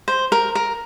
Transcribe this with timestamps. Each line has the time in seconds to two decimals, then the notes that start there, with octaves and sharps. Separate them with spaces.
0.08 C5
0.32 A#4
0.55 A#4